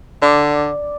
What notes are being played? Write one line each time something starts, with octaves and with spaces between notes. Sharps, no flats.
D3 D5